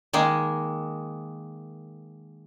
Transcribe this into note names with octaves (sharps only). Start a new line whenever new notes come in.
D#3 G#3 A#3